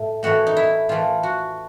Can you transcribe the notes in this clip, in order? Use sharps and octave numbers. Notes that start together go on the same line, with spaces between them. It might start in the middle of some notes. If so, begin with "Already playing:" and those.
Already playing: A2
A2 E3 A3 F#4
D#4
E4
A2 E3 A3 F4
F#4